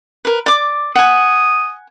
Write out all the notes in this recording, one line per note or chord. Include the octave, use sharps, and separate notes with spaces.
A#4 B4
D5 D6
F#5 G#5 D#6